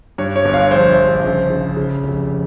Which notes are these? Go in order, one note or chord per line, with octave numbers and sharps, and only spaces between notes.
G2 C#5
C#5
G1
F5
A#1 C5
A#1
C#3
C#3
C#3
F1